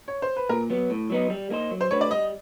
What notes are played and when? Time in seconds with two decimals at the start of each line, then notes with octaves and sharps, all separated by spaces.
0.08 C#5
0.22 C5
0.36 B4
0.49 A#2 A#4
0.70 F#3 B3
0.90 A2
1.10 F#3 B3 D#4
1.30 G3
1.50 A#3 D#4 G#4 C5
1.71 F#3
1.81 C5
1.91 A3 D4 F#4 B4 C#5
2.01 D5
2.11 G3 D#5